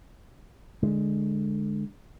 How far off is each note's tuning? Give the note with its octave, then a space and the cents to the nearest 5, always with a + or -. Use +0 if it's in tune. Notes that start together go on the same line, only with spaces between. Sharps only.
D3 +10 G#3 +0